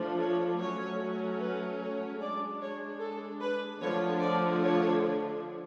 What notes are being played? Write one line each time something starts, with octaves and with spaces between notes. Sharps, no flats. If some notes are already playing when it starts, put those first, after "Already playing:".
Already playing: F3 A3 D4
C#5
F#3 A3 C#4 C#5
B4
C#5
G#3 D4 D5
C#5
A4
B4
D3 F3 A3 D4 C#5
D5
C#5